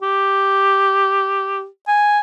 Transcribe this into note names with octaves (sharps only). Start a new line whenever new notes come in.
G4
G#5